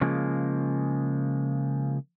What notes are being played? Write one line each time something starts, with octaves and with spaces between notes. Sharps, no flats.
C#3 F3 G#3 A#3